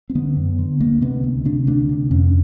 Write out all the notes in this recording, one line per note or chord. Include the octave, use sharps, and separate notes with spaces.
C4
D3 B3
F#2
D3
D2 A#3
C3 B3
D2
C3 D4
D2 D4
C3
F2 C#4